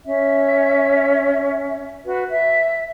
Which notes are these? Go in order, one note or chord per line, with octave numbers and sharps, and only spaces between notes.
C#4 E5
F#4 B4
E5